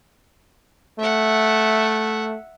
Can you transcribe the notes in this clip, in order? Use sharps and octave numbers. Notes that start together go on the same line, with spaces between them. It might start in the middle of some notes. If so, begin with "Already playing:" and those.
A3 E5 F#5